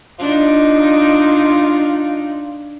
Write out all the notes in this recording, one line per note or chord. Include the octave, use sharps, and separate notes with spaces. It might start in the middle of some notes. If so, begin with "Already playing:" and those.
D4 D#4 F4